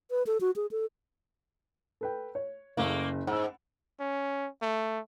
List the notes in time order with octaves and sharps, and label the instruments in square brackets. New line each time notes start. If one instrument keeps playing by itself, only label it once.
[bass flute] B4
A4
F#4
G#4
A4
[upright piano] A4 B4 G5
C#5
[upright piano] F#1 C#3 [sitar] A3 A#3
[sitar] G#2 [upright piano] F#5 E6
[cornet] C#4
A3